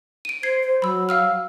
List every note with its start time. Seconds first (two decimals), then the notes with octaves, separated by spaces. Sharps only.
0.25 D7 D#7
0.43 C5 G#6 C7
0.63 C5
0.82 F#3 B5 E6
1.09 F5 E6 F6